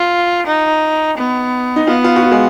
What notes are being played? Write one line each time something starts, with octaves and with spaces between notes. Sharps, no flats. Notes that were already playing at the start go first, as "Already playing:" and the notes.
Already playing: F4
D#4
B3
D#4
B3 F4
F4
F#4
F4
G#3